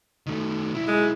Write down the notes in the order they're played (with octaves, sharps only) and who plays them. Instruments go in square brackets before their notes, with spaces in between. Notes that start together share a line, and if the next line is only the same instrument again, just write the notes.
[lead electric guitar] D#3 A3
B1 E4
[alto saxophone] G#3